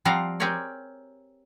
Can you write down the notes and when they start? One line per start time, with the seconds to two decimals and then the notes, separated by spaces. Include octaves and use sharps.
0.05 F3 G3 C4 F5 F#5 A#5
0.40 C4 G4 G#4 A#4 C#5 D5